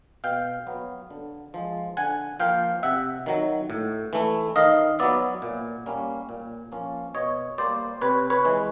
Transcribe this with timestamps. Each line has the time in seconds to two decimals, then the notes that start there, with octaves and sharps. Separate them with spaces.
0.24 B2 F5 G5
0.67 F#3 B3
1.11 D3
1.54 F3 G#3
1.97 D3 F#5 G#5
2.40 F3 A#3 F5 G5
2.83 C3 E5 F#5
3.26 D#3 F#3
3.70 A2
4.13 E3 A3
4.56 D#3 D#5 F5
4.99 F#3 B3 D5 E5
5.42 A#2
5.86 G3 A#3 C#4
6.29 A#2
6.72 F3 A#3 C#4
7.15 B2 C#5 D#5
7.58 G3 A#3 C5 D5
8.01 C3 B4 C#5
8.30 B4 C#5
8.45 E3 G#3